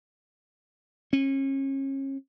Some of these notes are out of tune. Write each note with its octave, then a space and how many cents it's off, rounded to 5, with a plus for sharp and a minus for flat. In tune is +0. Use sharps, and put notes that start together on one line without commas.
C#4 -35